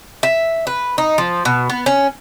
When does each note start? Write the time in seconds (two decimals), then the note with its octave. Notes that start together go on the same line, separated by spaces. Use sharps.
0.23 E5
0.67 B4
0.98 D#4
1.18 F3
1.45 B2
1.70 B3
1.86 C#4